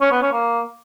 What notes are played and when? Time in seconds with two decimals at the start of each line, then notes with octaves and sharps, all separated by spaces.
0.01 C#4
0.11 B3
0.22 C#4
0.32 A#3